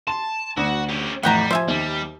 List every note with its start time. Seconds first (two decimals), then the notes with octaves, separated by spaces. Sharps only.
0.07 A5 C6
0.57 D2 F#4
0.89 C#4 G4
1.23 F2 A2 E3 G3 F#5 G5 A#5
1.51 F3 C5 E5 G#5
1.68 D#2 G3